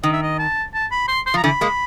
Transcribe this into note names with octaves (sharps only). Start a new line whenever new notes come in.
D#3 D#5
E5
D#5
A5
A5
B5
C6
C6
F3 A#5
D3 E3 B5
G#3 A#3